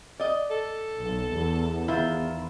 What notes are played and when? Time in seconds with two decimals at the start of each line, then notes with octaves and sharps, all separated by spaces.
0.20 D5 D#5
0.51 A4
1.02 B1
1.33 E2
1.88 D#3 E4 F4